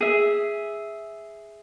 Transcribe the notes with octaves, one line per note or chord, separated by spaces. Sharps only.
G#4 E5